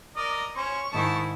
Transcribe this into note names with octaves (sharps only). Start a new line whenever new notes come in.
A#4 D5 D#5
C#4 C5 C#6
G#2 D#3 E4 A5